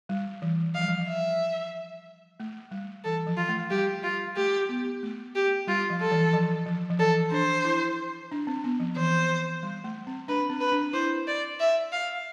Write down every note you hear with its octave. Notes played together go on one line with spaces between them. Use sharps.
G3
E3
F3 F5
G3
F3
E5
A3
G3
E3 A4
F3
F4
A3
G3 G4
F4
A3 G4
B3
A3
G4
G3 F4
F3
A4
E3
F3
F3
F3
E3 A4
D4 C5
E4
D4
C4
B3
F3
E3 C5
G3
A3
C4
D4 B4
C4
B4
D4
E4 C5
D5
E5
F5